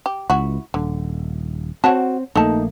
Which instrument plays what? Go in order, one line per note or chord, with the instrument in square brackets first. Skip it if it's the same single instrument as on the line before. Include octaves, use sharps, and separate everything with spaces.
[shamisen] G4
[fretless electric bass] C#2 [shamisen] E4 F#4
[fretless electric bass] D#1 [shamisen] D3
[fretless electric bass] C4 [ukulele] F#4 [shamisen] C#5 F#5 A5
[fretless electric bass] A#1 A3 A#3 [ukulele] D#4 [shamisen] A4 A5